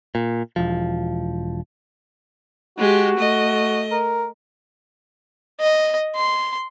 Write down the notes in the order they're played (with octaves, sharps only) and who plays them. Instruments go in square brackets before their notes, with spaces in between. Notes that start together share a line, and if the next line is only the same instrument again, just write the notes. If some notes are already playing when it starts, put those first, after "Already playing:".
[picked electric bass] A#2
E1 F3
[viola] G#3 G4 [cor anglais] F#4
[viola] A3 D#5
[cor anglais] A#4
[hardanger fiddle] D#5
C6